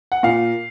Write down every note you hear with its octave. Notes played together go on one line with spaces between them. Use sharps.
F#5
A#2 F5